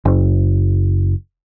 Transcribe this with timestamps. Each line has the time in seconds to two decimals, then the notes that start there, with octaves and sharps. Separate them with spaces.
0.05 F#1